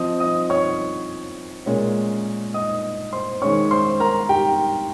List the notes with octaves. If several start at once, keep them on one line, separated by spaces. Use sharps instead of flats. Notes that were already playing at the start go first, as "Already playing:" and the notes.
Already playing: F3 C4 D#5 D#6
D#5 D#6
C#5 C#6
A#2 G#3 C#4
D#5 D#6
C5 C6
D#3 G#3 C#4 C#5 C#6
C5 C6
A#4 A#5
G4 G5